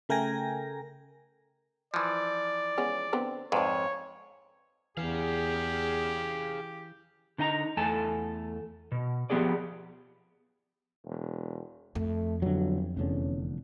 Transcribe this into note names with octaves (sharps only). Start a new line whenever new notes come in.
C#3 A3 A#4 G5 G#5 A#6
E3 F3 D5
G#3 B3 C#4
D3 B3 C4
F2 G#2 B4 C#5 D5
E2 E3 G4 G#4 F5
D3 D#4 D#5 G#5 A#5
E2 A3 A4 G#5 A5
B2
F3 B3 G4 G#4 D5
E1
F2 A3
G1 D3 F#3
F1 E2 D3 C#4